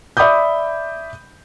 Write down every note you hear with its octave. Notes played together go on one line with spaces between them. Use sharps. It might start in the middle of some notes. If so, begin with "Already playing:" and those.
D5 E5 B5 D6 D#6 G6